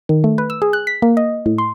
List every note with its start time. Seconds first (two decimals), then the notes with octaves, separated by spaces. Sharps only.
0.09 D#3
0.24 A3
0.38 B4
0.50 E6
0.62 G#4
0.73 F#6
0.87 B6
1.02 A#3
1.17 D#5
1.46 A2
1.58 C6